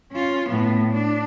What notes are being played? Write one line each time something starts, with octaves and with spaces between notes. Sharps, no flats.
C#4 F4
A2 B3
D4